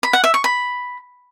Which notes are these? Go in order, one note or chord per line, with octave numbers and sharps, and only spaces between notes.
B5
F#5
E5
C#6
B5